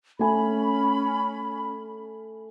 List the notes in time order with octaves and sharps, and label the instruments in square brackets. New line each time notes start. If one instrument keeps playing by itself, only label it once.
[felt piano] A3 G#5 [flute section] C#4 B5